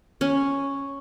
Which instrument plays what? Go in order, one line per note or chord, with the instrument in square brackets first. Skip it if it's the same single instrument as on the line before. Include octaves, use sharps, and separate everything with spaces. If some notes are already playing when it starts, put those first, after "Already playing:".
[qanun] C#4